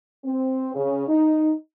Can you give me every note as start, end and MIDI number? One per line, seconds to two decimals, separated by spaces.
0.24 0.73 60
0.74 1.04 49
1.08 1.53 63